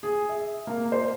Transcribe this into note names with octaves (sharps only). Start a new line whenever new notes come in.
G#4
E5
A#3
C5